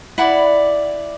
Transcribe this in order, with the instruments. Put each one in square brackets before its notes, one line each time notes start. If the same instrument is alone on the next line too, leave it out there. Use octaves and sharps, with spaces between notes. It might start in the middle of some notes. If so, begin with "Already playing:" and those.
[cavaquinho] E4 D5 F#5 B5